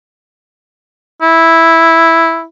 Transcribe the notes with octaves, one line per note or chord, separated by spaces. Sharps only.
E4